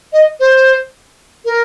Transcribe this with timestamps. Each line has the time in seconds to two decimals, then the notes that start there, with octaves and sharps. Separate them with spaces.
0.13 D#5
0.40 C5
1.45 A#4